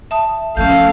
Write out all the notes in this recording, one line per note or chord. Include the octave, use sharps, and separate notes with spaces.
E5 A5 D#6
F3 A3 C#4 A4 F5 G6